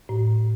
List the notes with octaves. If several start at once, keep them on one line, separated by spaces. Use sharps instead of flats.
A2